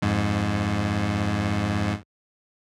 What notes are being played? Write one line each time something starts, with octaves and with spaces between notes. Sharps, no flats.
F2 G#2